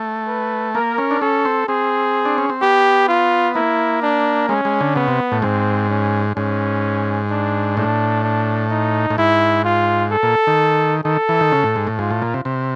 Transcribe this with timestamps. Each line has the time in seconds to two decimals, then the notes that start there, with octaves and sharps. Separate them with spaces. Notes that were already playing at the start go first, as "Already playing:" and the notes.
Already playing: A3
0.28 B4
0.75 A#3 A#4
0.98 C#4
1.11 D4
1.21 C#4 A4
1.45 C4
1.68 C4 G#4
2.25 D4
2.38 C#4
2.50 C4
2.62 B3 G4
3.08 F4
3.55 A#3 E4
4.02 D4
4.49 G#3 C#4
4.65 G#3
4.81 D3
4.96 C#3 B3
5.08 C3
5.32 A2
5.42 G#2 C4
5.90 C#4
6.37 G#2 C#4
7.30 D4
7.77 A2 D4
8.24 D4
8.71 D#4
9.10 A2
9.18 G#2 E4
9.65 F4
10.12 A4
10.23 A#2
10.47 D#3
11.05 D#3 A4
11.29 E3
11.41 D#3
11.52 C#3
11.64 A2
11.76 G#2
11.87 A2
11.99 G#2 F4
12.11 A2
12.22 A#2
12.34 C3
12.45 C3